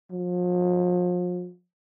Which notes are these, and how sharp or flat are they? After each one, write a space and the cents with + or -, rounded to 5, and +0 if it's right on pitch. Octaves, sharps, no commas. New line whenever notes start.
F3 +40